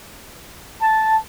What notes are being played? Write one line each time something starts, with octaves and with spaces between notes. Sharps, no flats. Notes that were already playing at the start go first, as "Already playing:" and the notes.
A5